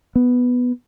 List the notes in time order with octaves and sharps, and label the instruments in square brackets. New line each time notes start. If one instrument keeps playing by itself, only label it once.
[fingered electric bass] B3